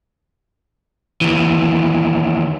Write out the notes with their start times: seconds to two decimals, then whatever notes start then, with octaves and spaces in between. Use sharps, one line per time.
1.21 D#2 E3